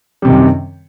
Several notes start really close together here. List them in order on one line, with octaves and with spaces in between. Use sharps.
G3 C3 D#3 F#2 C4